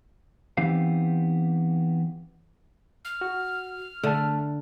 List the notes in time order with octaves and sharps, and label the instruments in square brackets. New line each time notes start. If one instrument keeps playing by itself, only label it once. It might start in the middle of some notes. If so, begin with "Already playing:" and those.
[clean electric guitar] E3 B3 C4 D#4 G4 F5
[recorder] F6
[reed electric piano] F#4
[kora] D3 [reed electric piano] A3 A5